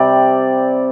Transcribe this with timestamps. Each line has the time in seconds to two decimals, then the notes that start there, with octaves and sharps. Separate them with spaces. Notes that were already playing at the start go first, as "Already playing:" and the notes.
Already playing: C3 G3 D5